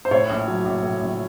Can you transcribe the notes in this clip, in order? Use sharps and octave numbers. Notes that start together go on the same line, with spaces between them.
C5
A2 C#5
A#1
F#3
A#1
A2
A#1